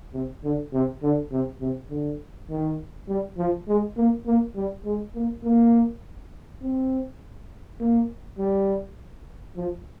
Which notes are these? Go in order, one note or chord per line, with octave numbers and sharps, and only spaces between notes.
C3
D3
C3
D3
C3
C3
D3
D#3
G3
F3
G#3
A#3
A#3
G3
G#3
A#3
A#3
C4
A#3
G3
F3